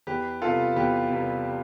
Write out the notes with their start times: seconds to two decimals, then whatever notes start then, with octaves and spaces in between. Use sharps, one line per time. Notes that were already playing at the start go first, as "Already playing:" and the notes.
0.07 E2 G4 B4
0.42 C3 G3 B3 F4 A4
0.76 E2 G4 B4
1.10 C3 G3 B3